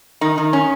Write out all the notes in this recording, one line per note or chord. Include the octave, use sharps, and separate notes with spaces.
D#3 D#4
D#3
C#4